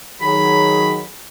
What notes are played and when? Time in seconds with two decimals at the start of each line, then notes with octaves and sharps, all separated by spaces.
0.21 D#3 F#3 G#4 B5